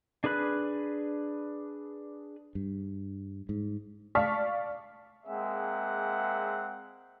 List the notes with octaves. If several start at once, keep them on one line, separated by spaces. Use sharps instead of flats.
D4 G#4 B4 B5 F#6
G2
G#2
D5 F5 A5 C#6 F6 B6
G#3 A#3 C4 G#4 E5 F#5